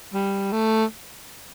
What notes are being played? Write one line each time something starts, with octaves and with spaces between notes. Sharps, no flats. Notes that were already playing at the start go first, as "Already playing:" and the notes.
G3
A3